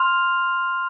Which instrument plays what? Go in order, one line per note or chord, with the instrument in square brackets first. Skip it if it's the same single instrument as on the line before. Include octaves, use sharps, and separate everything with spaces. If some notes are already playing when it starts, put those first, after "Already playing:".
Already playing: [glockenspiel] C6 F6 F7